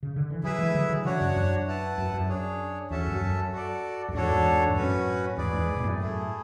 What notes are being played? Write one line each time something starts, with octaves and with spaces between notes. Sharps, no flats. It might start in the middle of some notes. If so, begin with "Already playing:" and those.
C#3
D3
E3
D3 F#3 E4 G#4 B4 E5
E3 G#3
D3 F#3
D3 F#3
C#3 E3 D4 F#4 C#5 F#5
F#2
F#2
E4 B4 F#5 A5
F#2
F#2
D4 G#4 C#5
E2 C#4 F#4 A4 E5 A5
E2
F#2
F#2
F#4 A4 D5
F#2
E2 G#2 D4 F#4 A4 C#5
E2 G#2
G#2
F#2 A2 C#4 F#4 B4
E2 G#2 G#4 B4 D5
E2 G#2
B2
F#2 A2
A3 E4 G#4